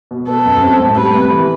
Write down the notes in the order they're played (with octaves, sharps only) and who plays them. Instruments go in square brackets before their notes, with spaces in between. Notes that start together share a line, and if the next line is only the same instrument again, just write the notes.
[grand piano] B2
[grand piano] B3 [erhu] A4
[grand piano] F#2
C4
A2
[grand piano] G3 [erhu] B4
[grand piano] C3
E3